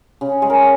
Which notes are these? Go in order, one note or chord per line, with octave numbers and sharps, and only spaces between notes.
C#3
G#3
A#4